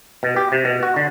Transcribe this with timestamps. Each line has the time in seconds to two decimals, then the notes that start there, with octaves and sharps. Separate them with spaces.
0.23 B2
0.36 G4
0.52 C3
0.65 B2
0.83 F#4
0.96 D3